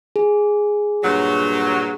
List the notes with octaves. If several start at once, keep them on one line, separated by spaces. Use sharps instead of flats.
G#4
G2 A#2 F#3